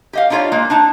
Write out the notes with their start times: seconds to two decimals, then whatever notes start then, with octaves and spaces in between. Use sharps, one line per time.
0.13 G4 D#5 F5
0.30 D4 D#4 F4 G4 C#5 D5
0.52 G#3 A#3
0.70 D4 D#4 A5